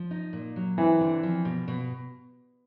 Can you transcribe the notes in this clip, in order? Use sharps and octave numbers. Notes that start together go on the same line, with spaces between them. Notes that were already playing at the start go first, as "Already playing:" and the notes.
Already playing: F3
D#4
A#2
F#3
E3 C4
D3
F3
B2
B2